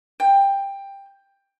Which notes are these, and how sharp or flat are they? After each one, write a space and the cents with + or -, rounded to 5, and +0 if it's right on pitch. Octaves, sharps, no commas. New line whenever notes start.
G5 +15